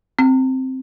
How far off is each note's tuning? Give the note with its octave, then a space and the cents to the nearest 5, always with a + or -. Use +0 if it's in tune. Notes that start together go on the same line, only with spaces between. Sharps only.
C4 +0